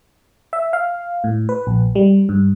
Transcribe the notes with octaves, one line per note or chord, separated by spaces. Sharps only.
E5
F5
A2
B4
A#1
G3
G2